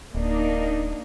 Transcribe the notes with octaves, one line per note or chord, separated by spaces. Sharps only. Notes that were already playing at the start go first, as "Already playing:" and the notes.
D1 A#3 D4 D#4